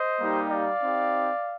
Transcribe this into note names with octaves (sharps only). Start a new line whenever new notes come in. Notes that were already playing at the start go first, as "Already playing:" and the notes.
Already playing: C5 D#5
G3 A#3 D#4 G4
D5 F5
C4 D#4 G4